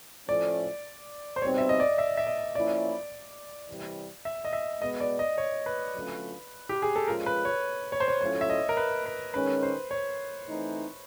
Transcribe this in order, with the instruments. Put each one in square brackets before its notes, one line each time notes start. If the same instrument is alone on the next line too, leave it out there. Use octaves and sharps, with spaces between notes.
[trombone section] A2 F3 A3 C#4 [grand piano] D5
[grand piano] C5
[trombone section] B2 G3 C4 D#4 [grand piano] C#5
[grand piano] E5
D#5
D5
E5
E5
D#5
[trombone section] F3 A#3 C#4 E4 [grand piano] D5
[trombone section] C3 E3 G3
[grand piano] E5
D#5
E5
[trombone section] B2 G#3 B3 [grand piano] D#5
[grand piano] D5
D#5
C#5
B4
[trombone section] D3 F#3 A3 C#4 F4
[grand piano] G4
G#4
A4
[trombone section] F3 G#3 C#4 F4 [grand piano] A#4
[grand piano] B4
C#5
C#5
C5
C#5
[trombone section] A2 F#3 A3 C#4 F4 [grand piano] C#5
[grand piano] E5
D#5
A#4
B4
B4
[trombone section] D#3 G#3 C#4 [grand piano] B4
[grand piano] C5
C#5
[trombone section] E3 A3 C4 D#4